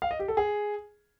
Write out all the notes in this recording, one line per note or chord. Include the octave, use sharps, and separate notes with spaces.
F5
D#5
G4
A4
G#4